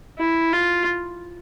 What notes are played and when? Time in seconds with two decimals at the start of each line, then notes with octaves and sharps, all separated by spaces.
0.19 E4
0.53 F4